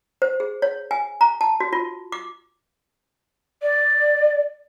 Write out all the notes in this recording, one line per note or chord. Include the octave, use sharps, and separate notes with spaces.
C5
G#4
C#5
G#5
A#5
A5
F#4
F4
D6
D5